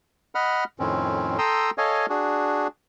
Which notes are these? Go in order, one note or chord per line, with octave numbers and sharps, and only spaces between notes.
D#5 F#5 B5 F6
F2 A2 D#3 C4 C#4
A4 G5 A#5 C6 D#6 E6
A4 C#5 D#5 F5 G#5
D4 F#4 G#4